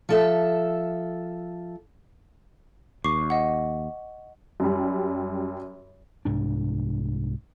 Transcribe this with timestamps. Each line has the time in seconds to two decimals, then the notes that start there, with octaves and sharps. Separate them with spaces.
0.09 F3 A4 E5
3.04 D#2 C#6 D6 C7
3.30 D#5 F#5
4.60 F#2 G3
6.25 C2 G#2 D4